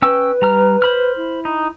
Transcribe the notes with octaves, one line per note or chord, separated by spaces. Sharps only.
C#4 B4 G5 E6
G3 A#5 F6
C5 B5 F6
E4
D#4